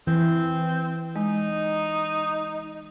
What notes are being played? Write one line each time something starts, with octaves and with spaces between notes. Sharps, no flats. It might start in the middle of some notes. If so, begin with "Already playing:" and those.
E3 C4
G#3 D#4